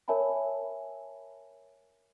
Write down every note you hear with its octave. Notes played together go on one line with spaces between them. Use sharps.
A#4 C#5 E5 G#5 A5 B5